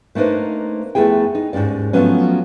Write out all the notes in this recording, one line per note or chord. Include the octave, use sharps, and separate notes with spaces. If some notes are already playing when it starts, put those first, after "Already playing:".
A3 A#3 D4 D#4 B4 C5
F2 A3 B3 E4 G#4 G5
D#4
D#2 G#2 C3 C#4 D5
F3 F#3 A3 B3 C#4